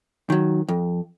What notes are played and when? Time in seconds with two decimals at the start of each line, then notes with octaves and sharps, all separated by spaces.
0.30 D#3 F#3
0.69 F2